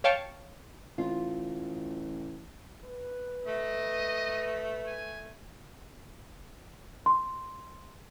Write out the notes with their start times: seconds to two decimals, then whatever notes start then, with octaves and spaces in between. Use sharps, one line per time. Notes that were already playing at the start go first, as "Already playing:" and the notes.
0.04 C#5 F5 G5 A5 C#6
0.98 A1 F4
2.83 B4
3.47 A3 D#5
4.87 G#5
7.06 C6